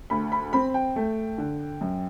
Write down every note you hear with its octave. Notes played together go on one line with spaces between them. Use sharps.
D2 B5
B5
C4 B5
G5
A3
D3
F#2